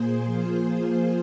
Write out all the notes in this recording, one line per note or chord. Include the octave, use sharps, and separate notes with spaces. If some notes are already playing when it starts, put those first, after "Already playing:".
Already playing: A#2 A#3 G#4 C5
F3 A#3 F4 G#4 C5